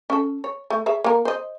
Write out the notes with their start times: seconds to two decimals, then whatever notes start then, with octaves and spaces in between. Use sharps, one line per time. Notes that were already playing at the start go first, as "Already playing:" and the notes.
0.10 C#4 A4
0.44 C#5
0.70 A3
0.86 G#4 C#5 E5
1.04 A#3 A#4
1.25 C5 D#5